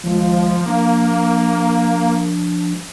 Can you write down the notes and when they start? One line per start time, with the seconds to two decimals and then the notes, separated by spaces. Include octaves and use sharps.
0.04 D2 D#3 F3 G#3
0.66 F3 A#3 D4